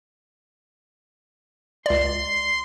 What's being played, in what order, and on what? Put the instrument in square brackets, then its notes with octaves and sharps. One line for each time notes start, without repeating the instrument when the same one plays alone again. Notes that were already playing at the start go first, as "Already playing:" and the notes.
[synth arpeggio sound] C#2 D5 [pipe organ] C6